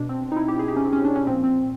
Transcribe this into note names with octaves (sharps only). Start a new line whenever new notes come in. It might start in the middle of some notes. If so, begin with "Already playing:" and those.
Already playing: B2 D4
C4
D#4
E4
G4
G#4
G4
C#4
C4
C#4
D4
C#4
A#2 F3 C4
C4